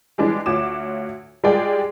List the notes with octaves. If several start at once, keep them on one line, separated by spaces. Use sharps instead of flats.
E3 G3 G#3 D4
D2 F4 F#4 C#5 D6 E7
G3 G#3 F4 G#4 D5 G5